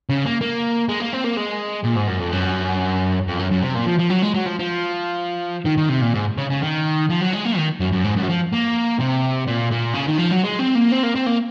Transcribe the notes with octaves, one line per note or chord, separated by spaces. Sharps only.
C#3
A#3
A#3
G#3
A#3
C4
A#3
G#3
A#2
G#2
F#2
F2
F#2
F2
F#2
F#2
C3
A#2
F3
F3
F#3
G#3
F#3
F3
F3
D#3
D#3
C3
A#2
G#2
C#3
C#3
D#3
F3
F#3
G#3
A#3
D#3
F#2
F#2
G#2
F#2
F#3
F3
A#3
C3
A#2
A#2
C#3
D#3
F3
F#3
G#3
C4
A#3
C4
A#3
C4
A#3